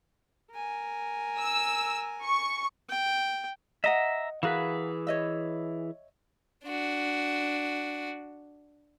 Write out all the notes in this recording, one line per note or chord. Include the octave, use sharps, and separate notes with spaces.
A#4 G#5
E6
C#6
G5
D#5 E5 F#5 A#5
E3 F#4 G#4 A#4 B4 F5
C#5 D#5 E5
D4 F#4